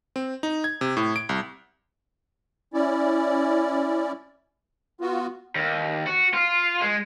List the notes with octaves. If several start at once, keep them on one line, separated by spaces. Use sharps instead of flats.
C4
D#4
G#6
C3
A2
D7
C2
C#4 E4 D5
B3 F4 F#4
D#2
F#4
F4
G#3